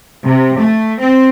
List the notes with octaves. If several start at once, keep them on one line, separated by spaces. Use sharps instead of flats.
C3
A3
C4